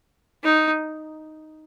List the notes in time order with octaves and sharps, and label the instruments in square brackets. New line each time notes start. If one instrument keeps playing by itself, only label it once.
[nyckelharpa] D#4